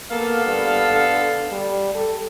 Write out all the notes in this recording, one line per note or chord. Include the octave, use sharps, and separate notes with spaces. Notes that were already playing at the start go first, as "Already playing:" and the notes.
A#3 B3 A4 F5
G2
D3
G3
A4